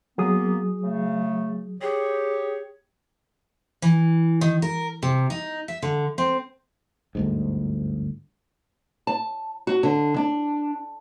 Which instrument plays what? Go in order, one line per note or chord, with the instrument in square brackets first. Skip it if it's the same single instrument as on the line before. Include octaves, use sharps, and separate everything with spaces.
[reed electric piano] F#3 G#4 D#6 [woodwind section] A#3 B3
[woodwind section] C#3 A3
[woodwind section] G4 C#5 [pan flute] G#4
[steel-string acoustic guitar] E3
D#3
A#4
C3
D#4
E5
D3
C4
[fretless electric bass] G1 D2 G#2
[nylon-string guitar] A5
F#4
D3
D4